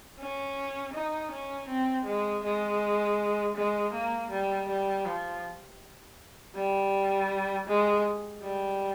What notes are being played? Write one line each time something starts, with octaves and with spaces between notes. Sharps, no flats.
C#4
D#4
C#4
C4
G#3
G#3
G#3
A#3
G3
G3
F3
G3
G#3
G3